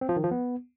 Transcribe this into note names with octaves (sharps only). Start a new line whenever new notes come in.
C4
F3
D#3
F3
B3